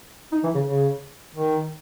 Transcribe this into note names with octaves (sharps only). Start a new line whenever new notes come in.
D#4
E3
C#3
C#3
D#3